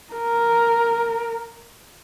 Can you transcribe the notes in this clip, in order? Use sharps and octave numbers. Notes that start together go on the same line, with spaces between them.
A#4